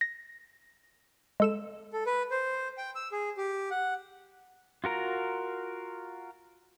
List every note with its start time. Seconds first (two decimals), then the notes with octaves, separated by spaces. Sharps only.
0.01 A#6
1.40 G#3 A4 E7
1.93 A4
2.06 B4
2.31 C5
2.78 G5
2.95 E6
3.12 G#4
3.37 G4
3.71 F#5
4.84 F4 F#4 A#4 A#5